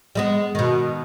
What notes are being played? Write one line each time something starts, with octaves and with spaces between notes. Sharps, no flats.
G3 G#3 B3
B2 D#3